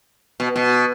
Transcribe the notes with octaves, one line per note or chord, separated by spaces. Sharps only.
B2
B2